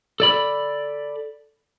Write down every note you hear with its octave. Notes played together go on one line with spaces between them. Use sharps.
A4 D5 B5